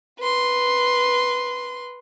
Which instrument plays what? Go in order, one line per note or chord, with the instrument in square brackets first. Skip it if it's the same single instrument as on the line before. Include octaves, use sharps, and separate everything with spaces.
[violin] B4 C6